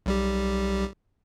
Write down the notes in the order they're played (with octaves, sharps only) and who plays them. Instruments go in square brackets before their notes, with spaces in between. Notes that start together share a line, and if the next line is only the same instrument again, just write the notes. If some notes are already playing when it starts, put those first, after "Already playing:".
[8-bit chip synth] B1 G3 G4